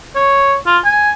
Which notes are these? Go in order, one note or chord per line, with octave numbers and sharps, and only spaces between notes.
C#5
F4
G#5